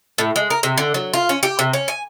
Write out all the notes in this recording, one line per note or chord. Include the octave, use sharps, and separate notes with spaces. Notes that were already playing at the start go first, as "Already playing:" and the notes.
A2
G#3
A#4
C3
D3
F#3
F4
C#4
G4
C3
C#4
G#5